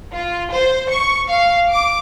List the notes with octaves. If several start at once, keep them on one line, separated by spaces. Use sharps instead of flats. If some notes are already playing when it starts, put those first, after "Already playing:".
F4
C5
C#6
F5
D6